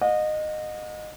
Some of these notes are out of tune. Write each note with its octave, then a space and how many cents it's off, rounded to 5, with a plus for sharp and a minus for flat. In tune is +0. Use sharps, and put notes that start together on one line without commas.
D#5 -20 F#5 -45